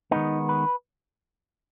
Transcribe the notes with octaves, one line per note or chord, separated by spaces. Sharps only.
D#3 G#3 B3 D#4
B4